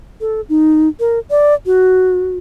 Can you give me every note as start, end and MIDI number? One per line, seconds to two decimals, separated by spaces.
0.21 0.41 69
0.49 0.88 63
1.00 1.19 70
1.31 1.54 74
1.66 2.38 66